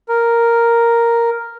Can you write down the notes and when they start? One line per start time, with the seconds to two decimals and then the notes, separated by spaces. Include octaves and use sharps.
0.09 A#4